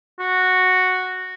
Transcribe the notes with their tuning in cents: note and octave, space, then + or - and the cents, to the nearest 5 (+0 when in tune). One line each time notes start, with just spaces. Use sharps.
F#4 -5